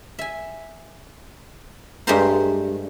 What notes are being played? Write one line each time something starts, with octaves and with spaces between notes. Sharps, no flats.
E5 G#5
G2 G#3 A3 G4 A#4 C5